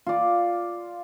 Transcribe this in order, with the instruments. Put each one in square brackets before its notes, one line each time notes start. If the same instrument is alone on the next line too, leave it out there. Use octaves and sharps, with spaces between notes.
[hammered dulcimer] F4 D5